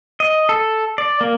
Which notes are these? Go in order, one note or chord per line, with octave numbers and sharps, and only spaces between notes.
D#5
A4
D5
A#3